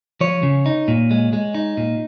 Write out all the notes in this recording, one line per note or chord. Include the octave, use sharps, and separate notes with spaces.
F3 C#5
C#3
D#4
A#2
G#3
G#3
D#4
A#2